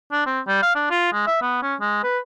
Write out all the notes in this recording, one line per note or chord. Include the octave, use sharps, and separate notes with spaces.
D4
C4
G3
F5
D4
F4
G#3
E5
B3
C#4
G#3
B4